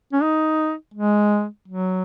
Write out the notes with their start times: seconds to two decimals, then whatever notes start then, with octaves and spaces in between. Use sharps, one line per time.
0.13 C#4
0.22 D#4
0.94 G#3
1.68 F#3